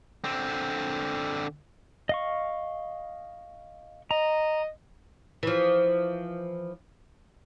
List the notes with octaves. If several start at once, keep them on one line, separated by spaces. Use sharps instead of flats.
D3 C4
D#5 F5 C#6
D#5 A#5
E3 F3